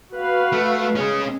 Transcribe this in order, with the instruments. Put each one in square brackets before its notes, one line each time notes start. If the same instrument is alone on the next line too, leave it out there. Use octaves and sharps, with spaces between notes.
[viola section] F#4 B4 F5
[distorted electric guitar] A3
[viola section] G#3 [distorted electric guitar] C#4 G#4